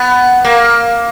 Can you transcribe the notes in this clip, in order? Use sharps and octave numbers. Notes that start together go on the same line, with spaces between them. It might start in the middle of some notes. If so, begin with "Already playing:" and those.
Already playing: B3
A#3